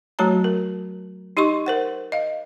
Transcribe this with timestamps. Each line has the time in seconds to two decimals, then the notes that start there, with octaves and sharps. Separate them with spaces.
0.19 F#3 A3 F#4 C#5 A5 A#5
0.44 A#4
1.37 D#4 G4 D#5 C6 C#6
1.66 A#4 C5 F#5
2.12 D#5 F5